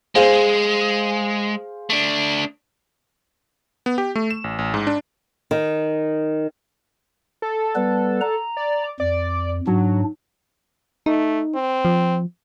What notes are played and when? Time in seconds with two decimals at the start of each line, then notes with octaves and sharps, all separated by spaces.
0.15 G#3 G#4 C5 F5
1.90 A3 D4
3.86 B3
3.98 G4
4.15 A3
4.31 E7
4.44 A1
4.59 A1
4.74 G#2
4.87 D4
5.51 D#3
7.42 A4
7.75 G3 B3 B4
8.21 A#5
8.57 D5
9.00 F2 D5
9.67 G#2 F#3 D4
11.06 A3 D#4
11.55 C4
11.85 F3